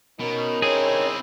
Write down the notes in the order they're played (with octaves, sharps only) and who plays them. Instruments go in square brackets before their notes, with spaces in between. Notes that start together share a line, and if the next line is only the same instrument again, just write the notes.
[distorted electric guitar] B2 [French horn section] C#4 D#4 A#4
[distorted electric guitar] C4 E4 [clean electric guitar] G#4 [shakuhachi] C#5